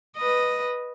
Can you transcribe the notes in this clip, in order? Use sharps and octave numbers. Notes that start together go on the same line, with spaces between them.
B4 D#5